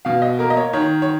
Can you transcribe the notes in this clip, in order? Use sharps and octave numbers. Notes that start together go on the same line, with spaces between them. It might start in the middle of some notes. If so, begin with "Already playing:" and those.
B2 F5
D#5
A#3 A#4
D#5
C#5
D#3 C#5
C#5